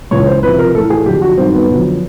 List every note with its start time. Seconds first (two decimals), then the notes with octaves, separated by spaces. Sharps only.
0.11 C#2 C#3 E3 G#3 C#5
0.27 C5
0.43 C#2 C3 F3 B4
0.59 A#4
0.75 A2 E3 A3 A4
0.90 G#4
1.06 F2 D3 F#3 G4
1.22 F#4
1.37 G2 D#3 F#3 C4
1.53 B3
1.69 F#2 D3 F3